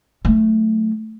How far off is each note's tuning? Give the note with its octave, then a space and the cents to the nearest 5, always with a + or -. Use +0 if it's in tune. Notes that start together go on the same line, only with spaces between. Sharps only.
F#3 +0 A3 +0